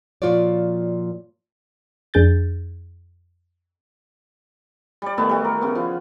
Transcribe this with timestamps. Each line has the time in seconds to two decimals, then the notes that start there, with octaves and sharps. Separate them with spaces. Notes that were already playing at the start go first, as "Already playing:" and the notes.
0.22 A#2 F3 F4 F#4 C#5 D5
2.14 F2 D4 G#4 G6 A6
5.02 G3 D5
5.17 D#3 A3 B3 E4
5.29 G3 F#4
5.45 A#4
5.61 C#3 B3
5.75 F3